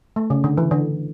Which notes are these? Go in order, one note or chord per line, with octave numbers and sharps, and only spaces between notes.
A3
C#3
D3
E3
D3